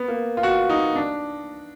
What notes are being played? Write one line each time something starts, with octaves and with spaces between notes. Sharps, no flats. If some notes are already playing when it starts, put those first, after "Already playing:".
Already playing: B3
A#3
F4
F#4
D#4
D4